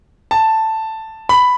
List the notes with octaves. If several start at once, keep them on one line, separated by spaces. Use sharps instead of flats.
A5
B5